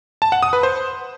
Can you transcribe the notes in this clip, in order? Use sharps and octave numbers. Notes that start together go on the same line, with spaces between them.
A5
F#5
D#6
B4
C5